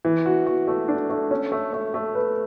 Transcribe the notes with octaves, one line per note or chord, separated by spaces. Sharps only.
E3
F#4
F#4
A3
D4
A3
C#4
A3
A3
A3
B4